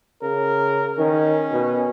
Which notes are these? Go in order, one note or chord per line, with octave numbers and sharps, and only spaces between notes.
C#3 A#4
D#3 C#4
B2